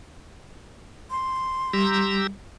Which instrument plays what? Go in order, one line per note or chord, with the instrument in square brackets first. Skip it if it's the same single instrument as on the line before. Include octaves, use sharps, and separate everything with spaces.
[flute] C6
[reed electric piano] G3 [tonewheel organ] G4 A#5 E6